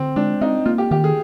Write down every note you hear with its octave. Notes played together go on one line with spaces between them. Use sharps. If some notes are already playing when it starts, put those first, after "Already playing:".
Already playing: D3 C4
G#3 D4
C4 D#4
A#3 F4
G4
D#3 G4
G#4